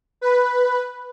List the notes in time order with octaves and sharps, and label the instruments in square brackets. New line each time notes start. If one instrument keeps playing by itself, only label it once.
[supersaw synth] B4